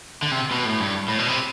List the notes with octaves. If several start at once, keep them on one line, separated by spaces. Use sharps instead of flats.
D3
C3
B2
A2
G2
A2
B2
C3